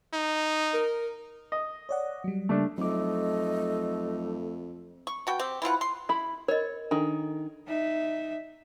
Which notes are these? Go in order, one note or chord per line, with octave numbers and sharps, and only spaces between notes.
D#4
A#4
D#5
C#5 D5 F#5
F#3 G3
C#3 G3 A3 A#3 D4
F2 F#3 A3 D#4 D#5 D6
C#6
B2 F#4 G5
C4 G4
E3 E4 F4 F#5
C6
E4 B5
A#4 C#5 D#5
D#3 D4 A4
D#4 E5